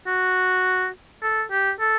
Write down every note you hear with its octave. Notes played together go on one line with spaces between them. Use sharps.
F#4
A4
G4
A4